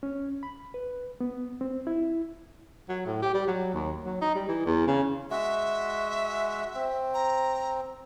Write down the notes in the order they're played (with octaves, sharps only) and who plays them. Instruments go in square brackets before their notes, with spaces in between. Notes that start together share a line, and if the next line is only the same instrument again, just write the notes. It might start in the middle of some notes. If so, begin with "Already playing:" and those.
[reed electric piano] C#4
B5
B4
B3
C4
E4
[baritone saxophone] F#3
A2
G4
G3
F#3
D#2
F#3
D#4
G3
E3
E2
C#3
[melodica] G#3 F#4 [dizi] E5
[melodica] C4
[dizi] A#5